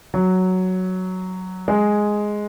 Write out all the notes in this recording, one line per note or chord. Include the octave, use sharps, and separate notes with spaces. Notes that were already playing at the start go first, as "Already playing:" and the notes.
F#3
G#3